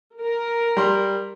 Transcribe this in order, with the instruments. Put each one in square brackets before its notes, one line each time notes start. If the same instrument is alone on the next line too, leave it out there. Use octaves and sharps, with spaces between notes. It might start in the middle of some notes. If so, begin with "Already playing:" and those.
[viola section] A#4
[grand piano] G3 C6